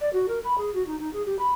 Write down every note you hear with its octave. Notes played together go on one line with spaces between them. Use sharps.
D5
F#4
A#4
B5
G#4
F#4
D#4
D#4
G#4
G4
B5